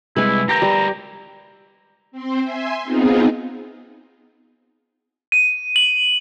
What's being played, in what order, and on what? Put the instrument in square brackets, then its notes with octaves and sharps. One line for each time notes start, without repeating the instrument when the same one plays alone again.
[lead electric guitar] C3 G3 [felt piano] G#3 [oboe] E4 [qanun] B4 G#5
[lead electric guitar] G4 A#4 [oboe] A#5 [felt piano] G6 A#6
[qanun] G3
[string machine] C4 C5
E5 G#5 C6
B3 C4 D#4 F4 G#4
[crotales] D#7
F#7